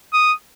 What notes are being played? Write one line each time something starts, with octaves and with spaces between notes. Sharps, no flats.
D#6